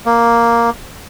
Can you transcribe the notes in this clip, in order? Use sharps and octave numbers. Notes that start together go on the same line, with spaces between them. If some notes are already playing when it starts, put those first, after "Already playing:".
A#3